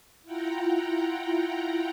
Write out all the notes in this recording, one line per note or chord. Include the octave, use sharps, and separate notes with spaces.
E4 F4 F#5 G5 A#5